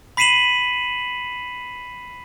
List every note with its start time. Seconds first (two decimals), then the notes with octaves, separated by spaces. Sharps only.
0.17 B5 B6 C7 D#7 E7 F#7